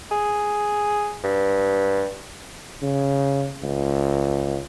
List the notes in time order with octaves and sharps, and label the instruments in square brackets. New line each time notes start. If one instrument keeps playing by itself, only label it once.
[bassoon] G#4
G2
[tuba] C#3
C#2